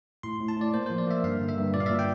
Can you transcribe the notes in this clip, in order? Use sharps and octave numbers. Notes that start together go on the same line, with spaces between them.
A2 C6
A2
A5
A2 D5
A#3 C5
F3 C5
D5
A#3 E5
G2 F5
D3
E5
G2
A#2 D5
F5
A#2 E5
G5